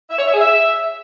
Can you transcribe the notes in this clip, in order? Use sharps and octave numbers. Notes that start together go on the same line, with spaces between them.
E5
C#5
E5
G#4
E5